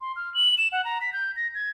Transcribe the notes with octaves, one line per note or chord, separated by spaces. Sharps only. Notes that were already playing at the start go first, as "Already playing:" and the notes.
C6
F6
F#7
E7
F#5
A#5
B6
G6
A#6
G#6